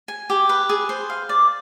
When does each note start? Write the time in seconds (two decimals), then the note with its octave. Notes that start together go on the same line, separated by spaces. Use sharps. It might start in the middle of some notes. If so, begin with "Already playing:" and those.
0.08 G#5
0.30 G4
0.49 B4
0.69 G#4
0.89 C5
1.10 F5
1.29 D5